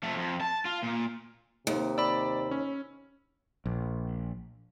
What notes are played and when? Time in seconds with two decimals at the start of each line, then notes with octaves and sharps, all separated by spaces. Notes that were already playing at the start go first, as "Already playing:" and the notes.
0.03 F2 A3
0.16 F2
0.41 A5
0.65 F4
0.83 A#2
1.67 D#2 C3
1.98 D5 B5 E6
2.51 C#4
3.66 A#1